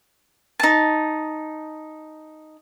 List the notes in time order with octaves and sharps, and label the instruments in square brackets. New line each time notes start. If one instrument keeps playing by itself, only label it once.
[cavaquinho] D#4 A5